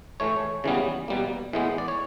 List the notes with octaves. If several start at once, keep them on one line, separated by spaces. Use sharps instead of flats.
A2 E3 A3 C#5
C#3 E3 G3 B3
B2 G3 A#3
A2 E3 G#3 B3
D5
C#5